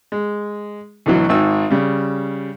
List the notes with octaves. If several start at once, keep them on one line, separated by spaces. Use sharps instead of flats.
G#3
D2 B2 E3 F#3
G#1 G#2 E6
C#3 G3